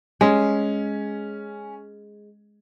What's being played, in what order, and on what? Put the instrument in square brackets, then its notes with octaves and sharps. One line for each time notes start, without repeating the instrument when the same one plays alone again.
[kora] G#3 [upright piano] C#4